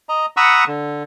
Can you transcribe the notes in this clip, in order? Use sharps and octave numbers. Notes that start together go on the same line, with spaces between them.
D#5 A#5
F#5 A#5 B5 C#6 D#6 E6
D3